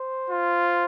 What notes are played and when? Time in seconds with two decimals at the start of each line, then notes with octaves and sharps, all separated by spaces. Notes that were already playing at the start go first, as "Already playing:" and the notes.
Already playing: C5
0.30 F4